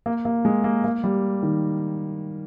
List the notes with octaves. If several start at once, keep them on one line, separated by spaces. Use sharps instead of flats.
A#3
A#3
G#3
A#3
A#3
G3
D#3